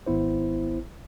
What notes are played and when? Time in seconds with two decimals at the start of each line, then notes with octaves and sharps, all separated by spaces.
0.06 G#1 B3 E4 C5